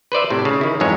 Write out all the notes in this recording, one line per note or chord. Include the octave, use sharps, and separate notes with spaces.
B4 C5 D5 E5
A2 C3
C#3
D#3 E4
F2 G#2 E3 G#3 C#5